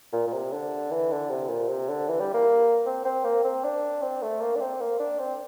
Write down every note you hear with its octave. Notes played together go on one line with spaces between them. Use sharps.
A#2
A#2
C3
D3
E3
D3
C3
A#2
C3
D3
E3
G3
A#3
C4
C4
A#3
C4
D4
C4
A3
A#3
D4
C4
A#3
D4
C4